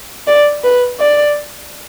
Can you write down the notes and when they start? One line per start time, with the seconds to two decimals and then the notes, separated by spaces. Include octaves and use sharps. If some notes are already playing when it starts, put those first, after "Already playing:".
0.27 D5
0.64 B4
1.00 D5